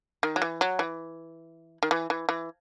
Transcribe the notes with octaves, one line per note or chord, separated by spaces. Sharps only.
D#3
F#3
E3
F#3
E3
D#3
E3
E3
E3